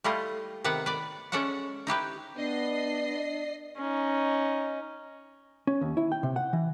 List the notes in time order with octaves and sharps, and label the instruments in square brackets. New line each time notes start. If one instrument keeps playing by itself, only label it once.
[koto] G3 A3 E4 F4 D#5
C3 D#3 B3 B4 F#5
B4 D5
G#3 C#4 A4 D5 E5 F#5
D#4 E4 G4 B4
[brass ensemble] B3 [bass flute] D4 [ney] D5 [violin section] D#5 C7
[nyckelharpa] C#4 D#4
[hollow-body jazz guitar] C#4
D#2
E4
G5
C3
F#5
E3